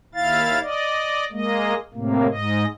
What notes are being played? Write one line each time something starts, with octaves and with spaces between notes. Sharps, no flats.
D#2 E4 F5 A6
D5 D#5
G#3 A#3 D#5
A2 C3 A#3
G#2 D#5